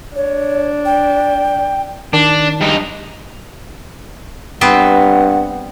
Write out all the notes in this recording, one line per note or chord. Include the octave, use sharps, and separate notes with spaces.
D4 C#5
G5
D#3 D4
G2 D#4
G2 B3 C4 F#5